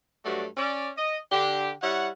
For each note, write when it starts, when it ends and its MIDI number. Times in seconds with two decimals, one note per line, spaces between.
0.25 0.46 43
0.25 0.46 54
0.25 0.46 57
0.25 0.46 66
0.25 0.46 74
0.57 0.90 61
0.57 0.90 74
0.96 1.18 75
1.32 1.71 50
1.32 1.71 67
1.82 2.09 55
1.82 2.09 64
1.82 2.09 73
1.82 2.09 78